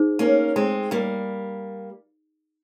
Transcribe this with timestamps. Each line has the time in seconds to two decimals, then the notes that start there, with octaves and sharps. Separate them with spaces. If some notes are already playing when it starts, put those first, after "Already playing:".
Already playing: D#4 G#4 C5
0.19 A#3 C#4
0.56 G#3 C4
0.91 G3 A#3